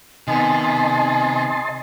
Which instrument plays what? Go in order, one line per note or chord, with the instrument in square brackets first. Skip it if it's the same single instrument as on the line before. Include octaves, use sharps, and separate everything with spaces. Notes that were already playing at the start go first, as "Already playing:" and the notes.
[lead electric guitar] C3 [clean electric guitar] D#3 B3 [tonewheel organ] D#5 A5 C6 [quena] G#5